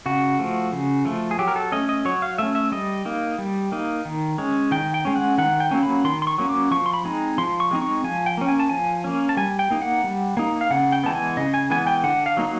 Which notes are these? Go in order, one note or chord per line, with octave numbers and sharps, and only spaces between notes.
C#3 F#4
F3 A3
C#3
F3 A3
G#4
F#3 G4
A#4
A4
A3 C#4 D#5
D#5
F#3 C#5
F5
A3 C#4 E5
E5
G3 D#5
A#3 D#4
G3
A#3 D#4
D#3
G#3 C#4
D#3 G5
G5
G#3 C#4
F#5
D#3 F#5
G5
F#3 A#3 C#4
B5
D#3 C6
C6
C#6
F#3 A#3 C#4
D6
F3 C#6
C6
B5
G#3 C4 D#4
F3 C6
C#6
G#3 C4 D#4
C#6
F3 G#5
G5
A#3 C#4
G#5
A5
F3 G#5
A#3 C#4
A5
G3 G#5
G5
A#3 D#4
F#5
G3
A#3 D#4
F5
C#3 F#5
G5
E3 G#3 B3 A5
G#5
C#3 D#5
G#5
E3 G#3 B3 G#5
G5
D3 F#5
F5
F#3 A#3 D#4